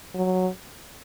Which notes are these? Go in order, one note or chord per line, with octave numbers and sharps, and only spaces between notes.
F#3